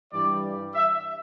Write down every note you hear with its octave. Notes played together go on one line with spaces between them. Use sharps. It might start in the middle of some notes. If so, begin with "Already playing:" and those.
G2 E3 G3 D5
E5